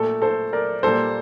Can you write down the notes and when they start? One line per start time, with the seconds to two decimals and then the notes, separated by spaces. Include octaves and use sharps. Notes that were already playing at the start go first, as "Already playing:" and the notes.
Already playing: A#2 A3 A4
0.22 A4 C5
0.53 A#4 D5
0.83 A#2 G3 A#3 A4 C5